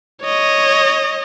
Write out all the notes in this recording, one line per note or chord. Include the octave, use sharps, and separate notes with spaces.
C#5 D#5